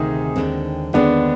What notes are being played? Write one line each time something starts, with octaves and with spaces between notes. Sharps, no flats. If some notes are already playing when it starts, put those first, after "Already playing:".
Already playing: D2 C3 D#3 D#4 G#4
D#2 D3 G#3 C4
D#2 D3 G#3 B3 C4 D4